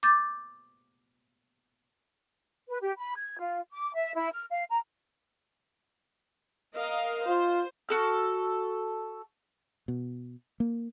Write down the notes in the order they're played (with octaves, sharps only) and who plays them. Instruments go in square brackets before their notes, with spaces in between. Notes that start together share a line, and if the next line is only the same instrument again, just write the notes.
[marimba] D6 G6 A6
[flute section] B4
G4
B5
G#6
F4
D6
E5
E4
F6
F5
A#5
[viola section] A#4 D#5 F5
[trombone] F4 [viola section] C5
[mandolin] F#4 A4 F6
[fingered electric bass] B2
A#3